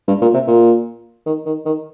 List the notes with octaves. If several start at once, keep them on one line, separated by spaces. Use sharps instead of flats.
G2
A#2
C3
A#2
D#3
D#3
D#3